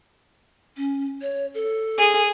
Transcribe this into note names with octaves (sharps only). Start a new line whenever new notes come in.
C#4
C#5
A4
G#4